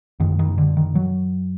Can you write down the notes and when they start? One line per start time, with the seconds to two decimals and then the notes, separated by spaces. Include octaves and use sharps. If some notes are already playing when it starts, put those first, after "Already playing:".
0.20 F#2 D3 D#3
0.39 D#3
0.58 D3
0.77 D#3
0.95 F#3